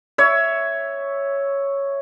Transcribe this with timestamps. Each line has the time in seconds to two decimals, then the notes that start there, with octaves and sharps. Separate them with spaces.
0.18 C#5 E5